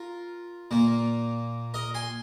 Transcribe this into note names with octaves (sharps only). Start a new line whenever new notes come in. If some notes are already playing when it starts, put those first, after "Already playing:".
Already playing: F4 A#4
A#2 A#3
A#4 D#5
G#5 C6